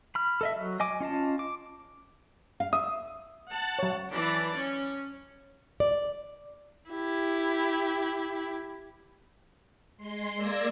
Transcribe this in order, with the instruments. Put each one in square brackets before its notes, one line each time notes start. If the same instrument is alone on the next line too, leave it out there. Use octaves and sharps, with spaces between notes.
[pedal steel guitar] B5 F6
A4 D#5 E5
F#3
D#5 G#5 D6
C#4 F4 D#5 A5
D6
[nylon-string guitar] F5
[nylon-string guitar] E5 [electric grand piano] D#6
[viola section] F#5 A5
[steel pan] F#3 C#5
[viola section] E3 D5 A5
C#4
[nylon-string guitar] D5
[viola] E4 G4
[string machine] G#3 C6
A#3 D5 E6 G#6 A#6